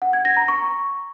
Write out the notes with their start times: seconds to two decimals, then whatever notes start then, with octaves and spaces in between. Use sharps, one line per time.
0.02 F#5
0.13 G#6
0.25 A#6
0.37 A#5
0.48 C#6